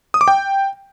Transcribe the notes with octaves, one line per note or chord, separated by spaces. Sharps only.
D#6
D6
G5